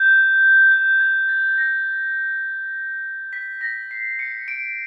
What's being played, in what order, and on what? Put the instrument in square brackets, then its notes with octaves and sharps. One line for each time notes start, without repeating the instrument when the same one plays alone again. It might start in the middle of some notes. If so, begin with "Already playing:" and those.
Already playing: [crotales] G6
G6
G#6
A6
A#6
B6
A#6
C7
C#7
D7